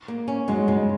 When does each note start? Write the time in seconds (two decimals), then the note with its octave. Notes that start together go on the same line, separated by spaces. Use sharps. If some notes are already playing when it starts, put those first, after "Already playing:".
0.08 A#3
0.28 C#4
0.48 F#3 G#3
0.68 C#3 G#3